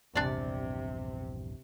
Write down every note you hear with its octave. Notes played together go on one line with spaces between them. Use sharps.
A#1 E2 G2 C3 D4 G#4 D5